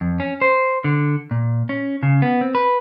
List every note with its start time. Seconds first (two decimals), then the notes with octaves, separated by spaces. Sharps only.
0.01 F2
0.20 C#4
0.42 C5
0.84 D3
1.31 A#2
1.69 C#4
2.03 C#3
2.22 B3
2.41 C4
2.55 B4